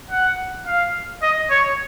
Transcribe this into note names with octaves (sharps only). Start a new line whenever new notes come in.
F#5
F5
D#5
C#5